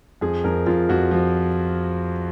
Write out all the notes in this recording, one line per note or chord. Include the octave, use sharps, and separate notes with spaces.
F2 G#4
F2 A#4
F2 F4
F2 F#4
F3